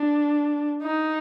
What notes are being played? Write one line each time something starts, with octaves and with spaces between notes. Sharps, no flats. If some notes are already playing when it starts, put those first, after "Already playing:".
Already playing: D4
D#4